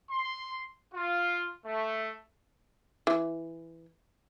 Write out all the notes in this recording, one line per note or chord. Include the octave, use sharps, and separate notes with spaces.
C6
F4
A3
E3